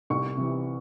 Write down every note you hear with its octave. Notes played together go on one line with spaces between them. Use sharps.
C2 C#6
C3 E3